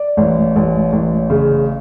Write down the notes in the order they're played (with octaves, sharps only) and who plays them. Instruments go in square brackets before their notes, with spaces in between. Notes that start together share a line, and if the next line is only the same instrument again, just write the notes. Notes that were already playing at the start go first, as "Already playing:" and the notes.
Already playing: [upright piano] D5
A1
A1
A1
C#3